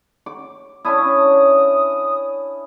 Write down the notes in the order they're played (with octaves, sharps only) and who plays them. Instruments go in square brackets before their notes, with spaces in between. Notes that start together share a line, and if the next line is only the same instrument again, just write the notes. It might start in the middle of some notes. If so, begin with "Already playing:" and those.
[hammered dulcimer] D6
[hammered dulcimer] C#4 D4 E4 [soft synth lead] D#6